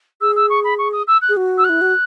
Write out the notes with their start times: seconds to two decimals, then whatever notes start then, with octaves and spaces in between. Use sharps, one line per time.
0.21 G#4 E6
0.36 E6
0.50 C#6
0.64 B5
0.78 C#6
0.92 D#6
1.07 E6
1.22 F#6
1.29 G#4
1.37 F#4
1.58 E6
1.64 F#6
1.69 E4
1.81 F#4